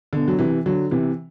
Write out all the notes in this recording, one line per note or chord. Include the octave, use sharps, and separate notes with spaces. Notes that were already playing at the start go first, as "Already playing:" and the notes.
B2 D3
F#3
C3 E3
D3 F#3
C3 E3